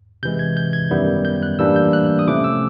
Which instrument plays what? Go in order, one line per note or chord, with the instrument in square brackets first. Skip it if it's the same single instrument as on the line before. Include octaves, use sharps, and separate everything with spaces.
[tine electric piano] C3 E3 G#3 G6
G#6
G6
G#6
F#2 D#3 G3 B3 E4
G6
F#6
A2 E3 G3 A#3 D4 E6
G6
F#6
D#6
C3 F3 A3 C#4 E4 D6
E6